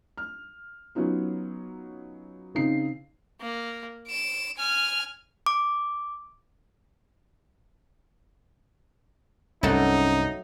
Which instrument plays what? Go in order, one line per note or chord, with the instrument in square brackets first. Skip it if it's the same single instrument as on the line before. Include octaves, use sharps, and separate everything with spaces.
[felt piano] F6
F#3 B3 C#4 D#4 F4
C#3 C4 D#4 C7
[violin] A#3
D7 E7
G#5 F6
[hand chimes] D6
[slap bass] C2 G2 [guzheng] F#3 A3 [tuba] C#4 [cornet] D#4